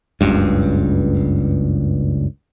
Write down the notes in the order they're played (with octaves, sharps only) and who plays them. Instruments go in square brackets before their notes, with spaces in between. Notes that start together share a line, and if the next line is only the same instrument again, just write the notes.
[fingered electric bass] F#1 C#2 G2